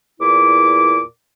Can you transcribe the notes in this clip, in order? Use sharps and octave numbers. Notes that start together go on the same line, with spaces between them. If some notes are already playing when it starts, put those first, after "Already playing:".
E2 A#2 E4 D6